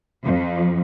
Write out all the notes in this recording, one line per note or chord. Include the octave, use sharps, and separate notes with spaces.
F2